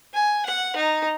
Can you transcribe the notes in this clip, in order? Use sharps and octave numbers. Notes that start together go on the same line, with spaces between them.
G#5
F#5
D#4